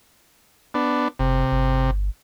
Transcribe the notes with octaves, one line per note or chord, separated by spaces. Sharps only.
B3 D4
F#1 C3
G1